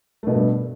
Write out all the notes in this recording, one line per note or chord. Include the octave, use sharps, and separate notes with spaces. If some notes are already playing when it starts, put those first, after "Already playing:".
G2 B2 A3 B3